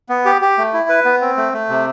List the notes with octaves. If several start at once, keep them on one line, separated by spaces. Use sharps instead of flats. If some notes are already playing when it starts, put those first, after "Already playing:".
B3
G4
G4
A3
E4
B4
B3
C4
A3
A3
C3